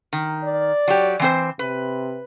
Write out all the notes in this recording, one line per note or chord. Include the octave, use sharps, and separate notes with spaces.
D#3
D5
F#3 G4
E3 C4 C5
C3 B4